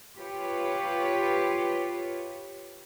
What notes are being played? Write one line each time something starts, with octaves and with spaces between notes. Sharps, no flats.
F4 G4 B4 C#5